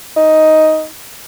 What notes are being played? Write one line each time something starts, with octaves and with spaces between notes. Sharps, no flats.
D#4